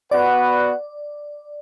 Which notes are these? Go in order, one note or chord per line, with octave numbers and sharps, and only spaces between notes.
B3 F#4 B4 D5 F#5